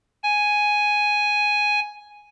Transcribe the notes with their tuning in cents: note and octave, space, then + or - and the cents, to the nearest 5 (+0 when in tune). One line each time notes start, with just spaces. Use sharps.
G#5 +0